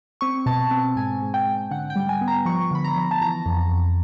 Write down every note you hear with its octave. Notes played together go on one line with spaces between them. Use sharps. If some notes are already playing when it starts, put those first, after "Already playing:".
C4 C#6
B2 A5
C4
G#2 G#5
G#2
G5
G#2
D3 F#5
G5
G3
G#5
B3
A#5
F3 C#6
D3 B5
A#5
F3
A5
E3 A#5
F2
F2